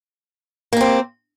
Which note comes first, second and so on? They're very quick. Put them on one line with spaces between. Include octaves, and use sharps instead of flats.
A#3 G4 C4